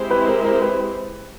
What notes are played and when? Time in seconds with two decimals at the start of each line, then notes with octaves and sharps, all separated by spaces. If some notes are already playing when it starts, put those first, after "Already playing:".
Already playing: G#3 C4 E4 G4 C5
0.10 B4
0.28 A#4
0.44 A#4
0.62 B4